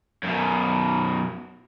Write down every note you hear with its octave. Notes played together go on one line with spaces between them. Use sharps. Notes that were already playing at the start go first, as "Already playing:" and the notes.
F#2 B2